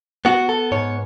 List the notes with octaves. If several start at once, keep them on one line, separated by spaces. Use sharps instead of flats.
B3 F#4
A4
G#2 C#5